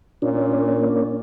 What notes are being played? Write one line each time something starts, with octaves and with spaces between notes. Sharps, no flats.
A#2 A#3 C#4 D4